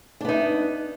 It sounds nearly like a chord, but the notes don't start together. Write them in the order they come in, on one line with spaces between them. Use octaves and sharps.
D4 B3 D#4